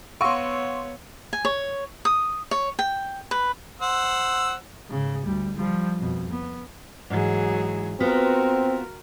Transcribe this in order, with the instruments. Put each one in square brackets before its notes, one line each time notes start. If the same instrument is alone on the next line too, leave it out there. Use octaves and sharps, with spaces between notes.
[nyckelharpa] B3 C#5 [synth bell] F5 F#5 E6 [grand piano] C6 C#6
[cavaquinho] G#5
C#5
D#6
C#5
G5
B4
[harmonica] C5 F#5 E6
[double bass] G#2 C#3
D2 G3
F3 G3
F2 B2
B3
[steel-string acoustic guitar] G#2 E3 [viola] F#3 G#4
[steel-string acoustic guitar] B3 F4 B4 [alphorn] C4 [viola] F#4 A#4